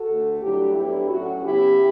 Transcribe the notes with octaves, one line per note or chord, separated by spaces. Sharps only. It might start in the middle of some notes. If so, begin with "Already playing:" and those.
Already playing: F#4 A4
D2 D3 A3
G2 F#3 A3 D4 E4 G4
A2 F#3 B3 D4 E4 G4
A2 F#3 C#4 F#4
C#3 F#3 B3 E4 G4